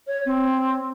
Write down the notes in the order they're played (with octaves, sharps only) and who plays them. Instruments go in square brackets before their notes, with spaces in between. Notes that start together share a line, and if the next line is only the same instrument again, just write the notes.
[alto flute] C#5
C4